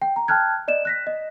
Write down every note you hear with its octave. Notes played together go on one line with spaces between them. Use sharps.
G5
A#5
G5 A5 F6 F#6 G#6
D5 D#5 E7
F#6 A#6 B6
D#5